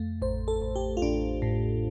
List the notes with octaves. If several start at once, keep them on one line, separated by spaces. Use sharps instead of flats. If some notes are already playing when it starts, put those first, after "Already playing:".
Already playing: F2 A3
A1 C5
A4
A1
G4
F4
A1 D4
A2